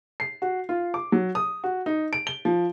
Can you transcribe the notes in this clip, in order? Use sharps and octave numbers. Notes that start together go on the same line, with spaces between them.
C7
F#4
F4
D6
F#3
D#6
F#4
D#4
D7
G7
F3